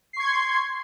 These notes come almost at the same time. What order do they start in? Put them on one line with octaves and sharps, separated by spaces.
C7 C#6 G#6 C6